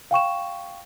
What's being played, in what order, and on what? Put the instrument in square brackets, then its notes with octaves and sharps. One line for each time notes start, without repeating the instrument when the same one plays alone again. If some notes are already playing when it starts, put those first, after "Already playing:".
[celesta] F5 G5 C#6 E7